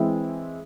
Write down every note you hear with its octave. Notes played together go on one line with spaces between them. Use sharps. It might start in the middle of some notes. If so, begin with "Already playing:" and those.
Already playing: E3 G#3 C4 E4